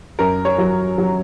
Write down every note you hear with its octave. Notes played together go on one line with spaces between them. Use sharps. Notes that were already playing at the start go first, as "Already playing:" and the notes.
F#2 A#4
C#5
F#3
F#3